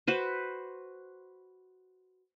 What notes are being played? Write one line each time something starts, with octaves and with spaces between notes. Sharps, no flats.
F#4 B4 C5